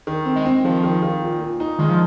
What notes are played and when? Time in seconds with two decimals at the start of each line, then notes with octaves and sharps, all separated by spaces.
0.07 D#3
0.25 C4
0.36 G#3
0.45 C4
0.64 D#3 F3
0.83 D#3
1.02 D#3
1.22 A#2
1.41 A#2
1.60 D#4
1.79 D#3 G#3
1.89 F3